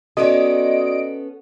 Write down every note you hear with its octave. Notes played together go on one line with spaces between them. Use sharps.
B3 C#4 F#4 A4 D5 D#5 D7